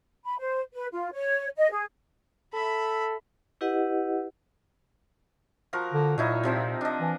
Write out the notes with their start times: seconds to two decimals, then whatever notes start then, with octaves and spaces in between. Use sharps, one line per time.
0.25 B5
0.39 C5
0.73 B4
0.92 F4
1.13 C#5
1.56 D#5
1.71 G#4
2.54 A4 E5 B5
3.61 E4 G4 B4 D#5 F#5
5.73 F3 F#4 A#4
5.93 D3
6.18 A#2 F#3 D#4 E4
6.43 C3 F3 C4
6.81 D4 D#5
7.01 E3